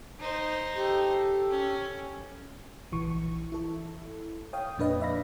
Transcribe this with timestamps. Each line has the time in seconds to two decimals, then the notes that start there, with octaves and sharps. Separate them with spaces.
0.20 D#4 C5
0.76 G4 A4
1.50 C#4
2.92 A#1 E3 C#6
3.52 E4 A4
4.53 C#5 F5 G5 D#6
4.78 F2 A#2 D4 B4 D#5
5.01 D5 E5 F5 B5 A#6